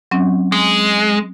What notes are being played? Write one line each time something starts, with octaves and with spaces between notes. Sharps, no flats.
F#3 C4 C#4
G#3